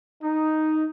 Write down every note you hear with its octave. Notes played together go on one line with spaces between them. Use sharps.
D#4